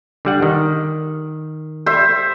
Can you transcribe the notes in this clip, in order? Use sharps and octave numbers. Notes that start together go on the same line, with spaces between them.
D3 G3 F#5
D#3
C5 E5